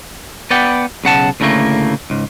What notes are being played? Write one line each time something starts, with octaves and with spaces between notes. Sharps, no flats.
B3 B4 D5 F#5 G5
B1 C#3 F#5 A5
D2 A2 C#3 A3 A#3
C#2 G#2